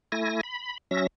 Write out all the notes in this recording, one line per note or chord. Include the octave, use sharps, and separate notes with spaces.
A3 E4 G#5 A#6
B5
F#3 C#4 E5 A#6